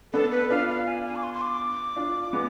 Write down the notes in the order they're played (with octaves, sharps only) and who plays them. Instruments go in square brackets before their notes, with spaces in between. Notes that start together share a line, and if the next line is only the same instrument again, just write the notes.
[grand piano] B3 D4 [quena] A4
[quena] B4
[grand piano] D4 F4 [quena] F5
[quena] F5
G#5
G#5
D6
C6
C6
D6
[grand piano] D4 F4
G#3 B3